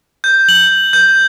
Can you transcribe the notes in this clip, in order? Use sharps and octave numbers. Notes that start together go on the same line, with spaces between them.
G6
F#7
G6